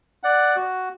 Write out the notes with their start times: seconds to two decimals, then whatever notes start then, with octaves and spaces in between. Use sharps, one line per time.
0.23 D5 F#5
0.56 F#4